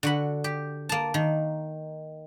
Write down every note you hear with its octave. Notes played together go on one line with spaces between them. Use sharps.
D3 F#4 B5
G4
A#3 A5
D#3